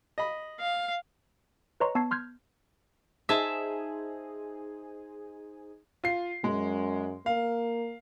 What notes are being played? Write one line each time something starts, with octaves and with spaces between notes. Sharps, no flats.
D#5 B5
F5
B4 C#5 D#5 A#5 C6 C#6
B3 A5 C#6 E6 G#6 C7
C6 F6 G6 G#6
D#4 G#4 C5 E5 A5
F4 C7
F#2 G#3
A#3 F5